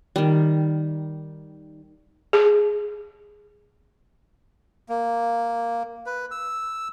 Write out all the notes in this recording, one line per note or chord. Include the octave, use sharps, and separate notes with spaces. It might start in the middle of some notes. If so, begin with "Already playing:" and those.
D#3 G3
G#4
A#3
B4
E6